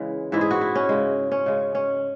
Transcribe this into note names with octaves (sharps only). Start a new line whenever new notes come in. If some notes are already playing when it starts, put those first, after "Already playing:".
Already playing: C#3 E3 G#3
G#2 E3 G#3 E4
G#4
F#4
E4
C#4
C#3 G#3
C#4
C#3 G#3
C#4